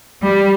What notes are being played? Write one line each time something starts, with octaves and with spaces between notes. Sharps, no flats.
G3